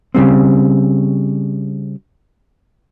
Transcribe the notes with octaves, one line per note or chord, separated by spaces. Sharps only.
C#3 G3 C4